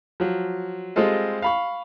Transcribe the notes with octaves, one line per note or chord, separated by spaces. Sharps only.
F3 F#3
G3 G#3 C4 F4 A4 D#5
F5 B5 C#6